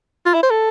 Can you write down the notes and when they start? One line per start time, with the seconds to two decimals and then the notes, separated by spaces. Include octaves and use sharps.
0.26 F4
0.34 E4
0.43 C5
0.50 A4